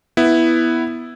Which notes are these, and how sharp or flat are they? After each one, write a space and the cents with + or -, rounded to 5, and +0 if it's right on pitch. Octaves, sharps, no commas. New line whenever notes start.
B3 +0 E4 +0